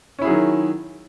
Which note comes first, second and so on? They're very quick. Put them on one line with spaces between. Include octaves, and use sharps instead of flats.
C#4 E4 G#4 F#3 D#3